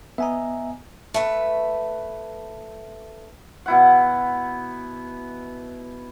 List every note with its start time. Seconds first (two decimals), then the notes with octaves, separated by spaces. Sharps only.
0.18 B3 D#5 E5 G#5 A#5
1.14 A3 B4
3.66 B2 E4 F#5